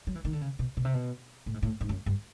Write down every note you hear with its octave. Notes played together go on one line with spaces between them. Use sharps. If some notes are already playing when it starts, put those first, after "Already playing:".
F#3
E3
D#3
D3
C#3
B2
B2
C3
B2
A2
G#2
A2
G#2
F#2
G2